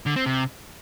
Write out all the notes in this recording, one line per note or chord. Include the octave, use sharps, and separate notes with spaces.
D3
C4
C3